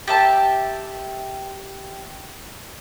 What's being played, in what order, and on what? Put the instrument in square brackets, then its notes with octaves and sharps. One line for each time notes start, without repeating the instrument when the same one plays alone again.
[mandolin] G4 E5 A5